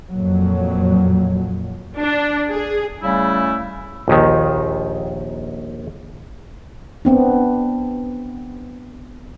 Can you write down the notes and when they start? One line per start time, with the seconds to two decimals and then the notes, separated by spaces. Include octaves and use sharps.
0.12 F2 A#2 F#3
1.98 D4
2.49 G#4
3.03 C#3 G3 A3 C#4 E4
4.08 A#1 D#2 D#3
7.05 B3 C4 D4